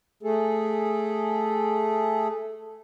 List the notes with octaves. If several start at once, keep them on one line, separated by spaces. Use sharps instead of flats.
A3 G#4 A4